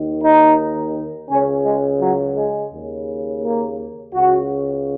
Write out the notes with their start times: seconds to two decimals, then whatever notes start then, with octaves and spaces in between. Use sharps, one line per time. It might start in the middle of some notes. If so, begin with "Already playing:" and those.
Already playing: D#2 D#3
0.23 D#4
1.29 C#2 C#3 C#4
1.65 G#3
2.01 F#3
2.36 G#3
2.72 D#2 C#3
3.43 A#3
4.14 C#2 C#3 F#4